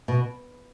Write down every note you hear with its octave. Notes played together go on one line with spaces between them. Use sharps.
B2